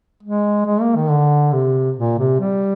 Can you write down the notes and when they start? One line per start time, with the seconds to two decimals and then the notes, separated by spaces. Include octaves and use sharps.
0.23 G#3
0.66 G#3
0.81 A#3
0.96 D#3
1.10 D3
1.52 C3
1.96 A#2
2.19 C3
2.40 G3